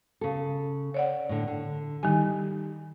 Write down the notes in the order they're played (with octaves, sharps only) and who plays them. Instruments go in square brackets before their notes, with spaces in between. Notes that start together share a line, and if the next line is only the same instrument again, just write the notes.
[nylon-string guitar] C#3 A4
[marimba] C#5 D5 F#5
[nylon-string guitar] A2 D3
D3
[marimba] D#3 G#5 [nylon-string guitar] G3 D#4